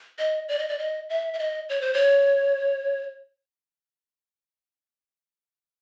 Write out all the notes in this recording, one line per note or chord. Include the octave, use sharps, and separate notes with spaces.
D#5
D5
D#5
D5
D#5
E5
E5
D#5
C#5
C5
C#5